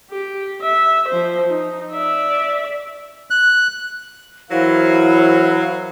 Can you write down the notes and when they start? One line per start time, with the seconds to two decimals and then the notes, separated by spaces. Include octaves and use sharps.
0.11 G4
0.62 E5
1.09 F3 C5
1.50 D#4
1.92 D5 E5
3.30 F#6
4.51 E3 F#3 E4 A#4 C5 F5